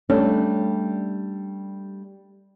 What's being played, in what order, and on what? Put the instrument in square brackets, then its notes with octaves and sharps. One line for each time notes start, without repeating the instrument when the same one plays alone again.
[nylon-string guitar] G3 A3 D4 [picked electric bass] C#4